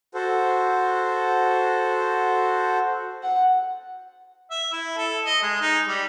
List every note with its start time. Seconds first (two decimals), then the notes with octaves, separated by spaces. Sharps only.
0.15 F#4 A4 C5
3.23 F#5
4.51 E5
4.73 E4
4.97 A4
5.25 D#5
5.43 G#3
5.62 D#4
5.88 G3